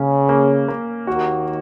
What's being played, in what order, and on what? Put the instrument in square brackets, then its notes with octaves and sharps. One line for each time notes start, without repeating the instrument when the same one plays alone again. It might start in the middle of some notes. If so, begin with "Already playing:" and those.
Already playing: [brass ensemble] C#3 [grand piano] A#3 C#4
[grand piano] A#3
A#3
[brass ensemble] D#2 D#3 [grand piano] F#4